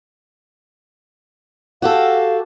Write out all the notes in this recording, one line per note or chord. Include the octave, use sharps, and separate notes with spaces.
F#4 G4 A4 F5